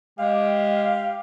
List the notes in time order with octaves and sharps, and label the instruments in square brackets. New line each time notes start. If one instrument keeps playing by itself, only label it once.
[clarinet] G#3 [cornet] G4 [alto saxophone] F5